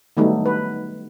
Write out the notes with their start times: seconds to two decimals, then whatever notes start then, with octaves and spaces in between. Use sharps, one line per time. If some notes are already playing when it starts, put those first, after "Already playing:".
0.17 D#3 F#3 G3 A3 B3 D#4
0.46 B4